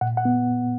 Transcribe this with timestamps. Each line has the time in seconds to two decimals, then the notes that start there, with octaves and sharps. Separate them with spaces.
0.01 A#2 F#5
0.17 F#5
0.25 B3